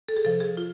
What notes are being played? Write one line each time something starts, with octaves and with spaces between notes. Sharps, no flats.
A4
G#4
C3 F3 A4
G#4
F4